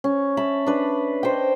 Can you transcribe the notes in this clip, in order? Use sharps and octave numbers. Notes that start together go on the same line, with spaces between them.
C#4
E5 A5 B5
D4 B4
C5 D#5 G5